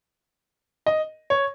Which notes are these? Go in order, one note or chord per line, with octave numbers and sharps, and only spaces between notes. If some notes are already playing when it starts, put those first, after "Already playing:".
D#5
C#5